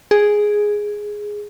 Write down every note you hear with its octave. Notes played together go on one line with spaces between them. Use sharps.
G#4